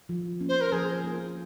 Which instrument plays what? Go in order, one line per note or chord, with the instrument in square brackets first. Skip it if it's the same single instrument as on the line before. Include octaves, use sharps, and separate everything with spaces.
[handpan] F3
A#3 C#4
[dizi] C5
A#4
[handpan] F3 [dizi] G#4
[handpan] A#3 F4